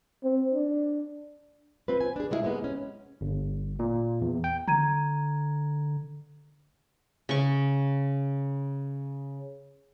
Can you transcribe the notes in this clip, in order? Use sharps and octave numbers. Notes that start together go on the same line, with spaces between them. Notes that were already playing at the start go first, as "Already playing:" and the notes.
C4
D4
C4 F4 B4
G#5
D4 G#4
F#3 G#3 B3 E4 F4 G#4
C3 G#3 A#3 B3
C#4
G1
A#2
E2
G5
D3 A#5 G#6 D#7
C#3 C#6